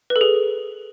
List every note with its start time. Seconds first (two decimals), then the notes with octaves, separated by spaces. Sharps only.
0.10 B4
0.16 A4
0.21 G#4